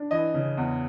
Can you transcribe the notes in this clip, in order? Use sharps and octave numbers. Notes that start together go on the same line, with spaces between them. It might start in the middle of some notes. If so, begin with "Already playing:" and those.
Already playing: D4
E3 D#5
C#3
E2